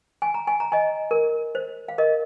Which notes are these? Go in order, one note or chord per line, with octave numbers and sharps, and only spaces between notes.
G#5
A#5
G#5
A#5
D#5 G#5
A#4
C5
F5
A#4 D#5